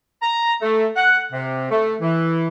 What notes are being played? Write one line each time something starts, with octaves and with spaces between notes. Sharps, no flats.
A#5
A3
F#5
C3
A3
E3